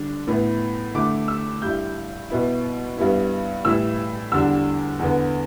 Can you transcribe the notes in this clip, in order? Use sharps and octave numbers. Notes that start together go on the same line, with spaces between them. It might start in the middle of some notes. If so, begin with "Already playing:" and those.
Already playing: D3 G3 D4
A2 E3 B3 E4
D3 A3 E4 D6
E6
G2 G3 E4 G6
B2 B3 E4
G2 G3 B3 E4
A2 E3 G3 E4 E6
E2 D3 G3 D4 E6
E2 D3 B3